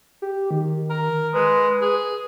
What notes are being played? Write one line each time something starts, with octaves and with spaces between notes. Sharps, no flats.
G4
D#3
A#4
G#3 B4
G#4